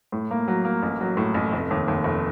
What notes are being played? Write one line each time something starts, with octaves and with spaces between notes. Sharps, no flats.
A2
A#3
F#3
A#3
A1
F#3
A2
A1
F1
D#2
D#2
F1